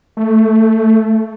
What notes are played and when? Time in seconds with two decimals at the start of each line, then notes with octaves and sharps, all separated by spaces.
0.17 A3